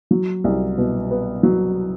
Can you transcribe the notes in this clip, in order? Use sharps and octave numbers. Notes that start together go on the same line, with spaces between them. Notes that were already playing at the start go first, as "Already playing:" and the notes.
F#3
C2
B2
B3
F#3